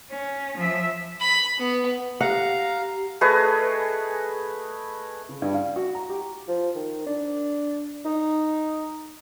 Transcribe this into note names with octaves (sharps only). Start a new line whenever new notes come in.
C#4
F3 E5
B5
B3
G4 F5 F#5 A#5
A3 G#4 B4 D#5
C#3
G2
F5
F#4
A#5
G4
F3
D#3
D4
D#4